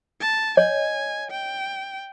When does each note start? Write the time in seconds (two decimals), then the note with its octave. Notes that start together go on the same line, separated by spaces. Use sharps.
0.21 A5
0.57 C#5 D#5 G#5
1.31 G5